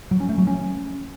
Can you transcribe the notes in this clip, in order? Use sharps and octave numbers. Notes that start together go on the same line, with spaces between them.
F#3
C#4
A3
F#3
C#4